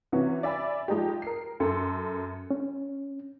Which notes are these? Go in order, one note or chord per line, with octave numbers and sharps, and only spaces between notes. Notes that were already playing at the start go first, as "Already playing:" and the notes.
C3 E3 C#4 F#4
D5 E5 G#5 B5
F3 G#3 D#4 G4
A#4 C7
F#2 A4 C6
C#4